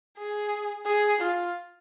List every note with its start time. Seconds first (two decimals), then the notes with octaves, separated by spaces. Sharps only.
0.18 G#4
0.86 G#4
1.20 F4